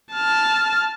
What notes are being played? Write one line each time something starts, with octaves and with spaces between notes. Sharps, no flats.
A5 F6